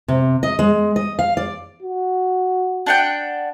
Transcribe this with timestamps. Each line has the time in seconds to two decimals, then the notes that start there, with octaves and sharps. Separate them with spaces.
0.08 C3
0.43 D#5
0.59 G#3
0.96 D#5
1.19 F5
1.37 D5
1.82 F#4
2.86 D4 F#5 G5